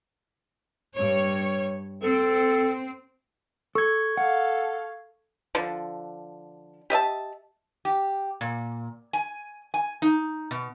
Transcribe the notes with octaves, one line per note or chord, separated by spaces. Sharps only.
G2 C#5
C4 A4
A4 C#6 G#6
A4 F5 F#5
D3 F3
G4 D#5 E5 A5
G4
A#2
G#5
G#5
D#4
B2